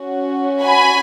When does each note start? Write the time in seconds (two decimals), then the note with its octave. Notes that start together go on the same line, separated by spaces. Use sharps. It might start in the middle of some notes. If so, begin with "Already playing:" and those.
Already playing: C#4 F#4
0.63 G#5 B5